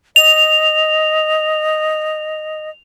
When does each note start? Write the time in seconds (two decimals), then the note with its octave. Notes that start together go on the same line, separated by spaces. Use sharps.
0.16 D#5 F7